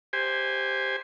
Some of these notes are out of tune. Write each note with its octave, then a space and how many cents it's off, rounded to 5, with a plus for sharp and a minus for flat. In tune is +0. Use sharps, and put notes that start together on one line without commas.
G4 +0 C5 +0 G#5 -20